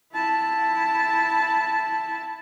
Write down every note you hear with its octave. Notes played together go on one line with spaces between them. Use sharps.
E4 A5